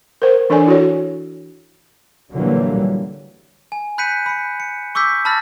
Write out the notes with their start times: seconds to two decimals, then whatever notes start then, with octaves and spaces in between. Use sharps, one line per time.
0.22 A#4 C5
0.50 E3 D4 A4 D5 G#5
0.66 E4 F#4 C#5
2.34 A#2 D3 E3 F#3 G3 A#3
3.72 G#5
3.98 B5 F#6 G6 B6 C#7 D#7
4.26 B5 C#7
4.60 C#7
4.95 C#6 D6 E6 G6 B6
5.25 A5 B5 E6 F6 A6 A#6